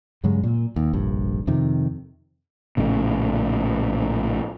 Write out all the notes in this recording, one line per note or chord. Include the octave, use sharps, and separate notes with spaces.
G2 C#3 F#3 G#3
A#2
D#2
F1 A#1 G2
F2 C3 D#3
A#1 A2 C#3